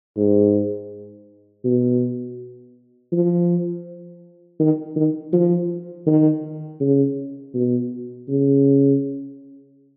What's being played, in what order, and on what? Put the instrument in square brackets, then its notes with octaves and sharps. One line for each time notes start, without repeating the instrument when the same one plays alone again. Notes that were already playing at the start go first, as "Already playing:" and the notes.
[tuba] G#2
B2
F3
D#3
D#3
F3
D#3
C#3
B2
C#3